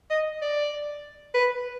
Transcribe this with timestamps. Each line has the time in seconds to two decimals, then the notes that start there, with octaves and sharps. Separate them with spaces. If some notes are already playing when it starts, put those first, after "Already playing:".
0.10 D#5
0.42 D5
1.34 B4